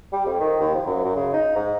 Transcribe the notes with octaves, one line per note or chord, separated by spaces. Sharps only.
G3
F2
D#3
D#2
F3
F#2
F#2
C#3
D#4
G#2